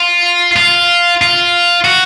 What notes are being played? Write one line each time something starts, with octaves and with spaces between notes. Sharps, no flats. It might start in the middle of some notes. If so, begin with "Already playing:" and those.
Already playing: F4
F4
F4
F#4